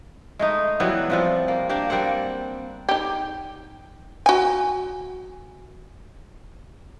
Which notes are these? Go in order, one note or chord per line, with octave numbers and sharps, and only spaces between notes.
G#3 A3 D#4
E3 F#3 G3 B3
C3 F3 G3
A#3
A#3 D4 G4
G3 A#3 C4 F#5
D#4 G4
F#4 G#5